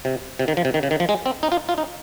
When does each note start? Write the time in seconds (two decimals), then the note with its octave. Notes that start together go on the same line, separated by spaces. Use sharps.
0.05 C3
0.39 C3
0.48 D#3
0.57 F3
0.65 C3
0.74 D#3
0.83 C#3
0.91 D#3
1.00 F3
1.09 G#3
1.26 C4
1.43 D#4
1.52 F4
1.69 F4
1.78 D#4